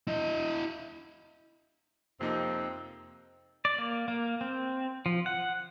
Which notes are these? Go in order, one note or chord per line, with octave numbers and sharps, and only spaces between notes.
E4 D#5
F2 C3 A#3 C4 D#4
D5
A#3
A#3
C4
F3
F#5